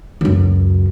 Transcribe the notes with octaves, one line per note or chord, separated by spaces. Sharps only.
C#2 F#2